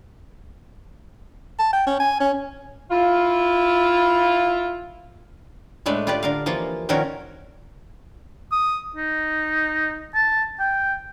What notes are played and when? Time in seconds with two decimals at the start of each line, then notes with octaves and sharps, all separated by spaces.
1.59 A5
1.73 G5
1.87 C#4
2.00 G#5
2.20 C#4
2.90 E4 F4
5.86 A2 G#3 A3 D4 B4
6.07 F4 G4 B4 D5
6.23 D3 A#4 F5
6.46 E3 F3 A#3 F4
6.89 A#2 D#3 F3 C#4 F#4 A#4
8.52 D#6
8.96 D#4
10.14 A5
10.60 G5